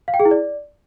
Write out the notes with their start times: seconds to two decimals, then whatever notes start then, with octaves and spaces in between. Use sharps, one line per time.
0.08 F5
0.14 G5
0.20 G#4
0.25 E4
0.31 D5